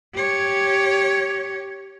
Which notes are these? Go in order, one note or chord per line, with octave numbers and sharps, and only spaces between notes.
G4 C#5